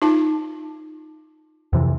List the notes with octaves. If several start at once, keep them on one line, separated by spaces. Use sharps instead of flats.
D#4 F4 A5
F2 C3 E3